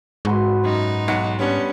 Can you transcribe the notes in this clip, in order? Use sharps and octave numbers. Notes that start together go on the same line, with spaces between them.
G#2 F#4 B4 C6
F#2 D#4
B1 F#5 C#7
G3 B3 C#4 D4